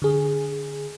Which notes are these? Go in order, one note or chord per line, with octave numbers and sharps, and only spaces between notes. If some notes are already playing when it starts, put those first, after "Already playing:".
D3 G#4